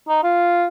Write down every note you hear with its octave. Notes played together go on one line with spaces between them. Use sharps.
D#4
F4